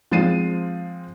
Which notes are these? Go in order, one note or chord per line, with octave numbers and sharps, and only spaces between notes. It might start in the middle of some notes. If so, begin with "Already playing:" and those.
F3 G#3 C4 A6 C7 D#7